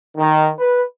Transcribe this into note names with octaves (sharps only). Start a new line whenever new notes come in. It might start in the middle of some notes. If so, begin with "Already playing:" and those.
D#3
B4